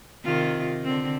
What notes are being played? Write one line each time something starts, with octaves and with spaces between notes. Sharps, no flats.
C3 D#3 F4
D3 C4